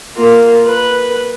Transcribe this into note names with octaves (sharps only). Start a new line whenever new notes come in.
A#3 F4
B4